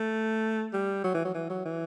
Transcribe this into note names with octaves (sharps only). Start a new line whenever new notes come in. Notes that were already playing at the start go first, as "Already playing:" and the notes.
Already playing: A3
G3
F#3
E3
F#3
E3
F#3
E3